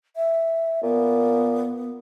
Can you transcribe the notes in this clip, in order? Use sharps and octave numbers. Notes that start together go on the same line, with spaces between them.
E5
A#2 B3